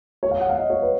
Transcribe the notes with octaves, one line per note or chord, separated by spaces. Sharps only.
C#5
F5
F#5
F5
D#5
C#5
B4